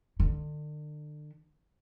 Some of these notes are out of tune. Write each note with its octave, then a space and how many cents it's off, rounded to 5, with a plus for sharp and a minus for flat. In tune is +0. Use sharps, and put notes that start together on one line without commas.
D3 +35